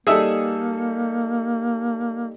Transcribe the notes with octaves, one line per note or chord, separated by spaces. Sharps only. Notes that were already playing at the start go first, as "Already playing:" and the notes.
G3 A#3 D#4 G#4 A4 E5